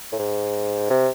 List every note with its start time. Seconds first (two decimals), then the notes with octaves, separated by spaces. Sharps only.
0.12 A2
0.19 G#2
0.90 C3